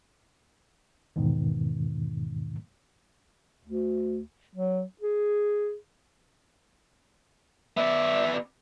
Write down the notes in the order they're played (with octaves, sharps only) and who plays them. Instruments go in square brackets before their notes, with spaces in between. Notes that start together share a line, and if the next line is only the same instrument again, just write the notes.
[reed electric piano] E2 G#2 B2 D#3
[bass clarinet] D2
F#3
G#4
[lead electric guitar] B3 D5 [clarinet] E5